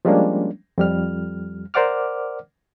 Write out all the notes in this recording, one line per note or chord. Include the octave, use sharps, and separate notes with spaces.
F3 G3 G#3 A#3 C#4 D4
F2 G3 F6
A#4 C5 D5 F#5 D6 F6